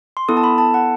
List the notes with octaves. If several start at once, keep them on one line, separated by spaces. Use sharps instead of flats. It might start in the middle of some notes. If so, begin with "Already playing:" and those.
C6
B3 E4 A4 D#6
A5
B5
A5
F#5